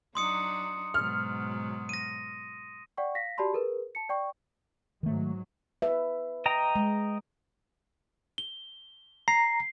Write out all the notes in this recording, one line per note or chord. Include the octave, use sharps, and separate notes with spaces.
F#3 D4 D#4 C6 D#6 C#7
G#2 B2 F#3 F6
A#6 D#7
D5 F#5 G5 C#6
F5 A#6 B6
F#4 G4 D5 A5 B5 C6
G#4 A#4 B4
A5 C#7
D5 G5 C#6
G#2 D#3 F#3 A3
B4 E5
D#5 G5 A#5
G#3
G7
A#5 C7